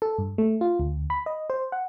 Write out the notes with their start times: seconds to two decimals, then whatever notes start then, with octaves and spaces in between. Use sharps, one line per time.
0.02 A4
0.18 G2
0.38 A3
0.61 F4
0.80 D2
1.10 B5
1.26 D#5
1.50 C5
1.72 F#5